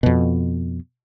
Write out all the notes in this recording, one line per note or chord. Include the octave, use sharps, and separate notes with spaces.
F2 B2